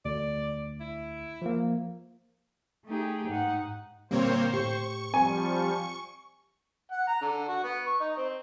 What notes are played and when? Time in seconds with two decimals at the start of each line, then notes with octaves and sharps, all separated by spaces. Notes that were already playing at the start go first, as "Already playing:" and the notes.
0.05 D2 D5
0.80 E4
1.42 F3 A#3
2.87 A3 D#4 G4 G#4
3.29 G#2 D#4 F#5
4.11 A#2 D3 G3 A#3 C4 C5 C#5
4.53 A2 G4 C#6
5.14 F3 G3 C4 G#5
6.91 F#5
7.07 A#5
7.21 D3
7.48 F#4
7.64 B3
7.86 C#6
8.00 D#4
8.17 C4